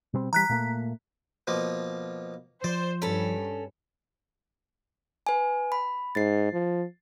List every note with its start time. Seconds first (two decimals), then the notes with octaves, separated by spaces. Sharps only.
0.13 B2 G3 C4
0.33 E3 G3 A#5 F#6 B6
0.49 A#2 A3 A#3
1.47 B2 F3 A#3
2.64 F3 C5 D5
3.02 G2 C#4 A4 B5
5.27 B4 G#5
5.72 B5
6.15 G#2 A6 C7
6.53 F3